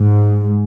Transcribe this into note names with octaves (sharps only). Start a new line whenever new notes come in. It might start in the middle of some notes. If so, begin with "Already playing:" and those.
Already playing: G#2